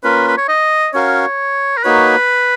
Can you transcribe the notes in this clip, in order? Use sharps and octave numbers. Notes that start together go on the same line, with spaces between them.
A#3 C#4 F4 A#4 B4
B4
C#5
D#5
C#4 F#4 A#4 C#5 F5
A#4
A#3 D#4 F#4 B4 C#5